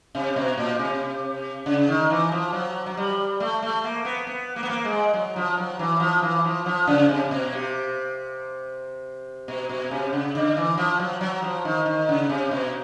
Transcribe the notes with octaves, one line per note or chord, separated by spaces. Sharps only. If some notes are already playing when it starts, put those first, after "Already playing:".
C3
B2
A#2
C3
C#3
D#3
E3
F3
F#3
F#3
G3
A3
A3
A#3
B3
B3
A#3
B3
A#3
G#3
F#3
F3
F#3
E3
F3
E3
F3
F3
C#3
C3
B2
C3
B2
B2
C3
C#3
D3
E3
F3
F#3
F#3
F3
D#3
D#3
C#3
C3
B2